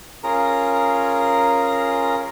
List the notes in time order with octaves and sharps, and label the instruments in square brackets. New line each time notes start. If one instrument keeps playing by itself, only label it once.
[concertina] C#4 F4 G#4 A#4 A#5